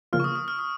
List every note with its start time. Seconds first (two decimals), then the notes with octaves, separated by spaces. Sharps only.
0.13 C#3 F3 A#3 F4 F6
0.20 C#6
0.24 D#6
0.36 D#6
0.48 F6
0.59 D#6